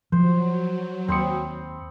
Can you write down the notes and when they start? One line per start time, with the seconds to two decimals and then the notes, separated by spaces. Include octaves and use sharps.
0.12 F3 F#3 C5
1.08 D#2 C4 B5 C6 D#6 C#7